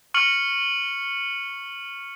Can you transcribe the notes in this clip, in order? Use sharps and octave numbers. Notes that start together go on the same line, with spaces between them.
C#6 F6 C#7 F#7